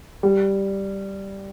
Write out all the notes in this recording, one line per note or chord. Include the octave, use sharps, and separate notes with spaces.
G3